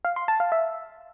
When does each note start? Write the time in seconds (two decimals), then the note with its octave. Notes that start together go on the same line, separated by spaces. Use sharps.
0.05 F5
0.16 C6
0.28 A5
0.40 F5
0.52 E5